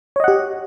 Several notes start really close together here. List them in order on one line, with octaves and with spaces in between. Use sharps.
C#5 D#5 F#5 G4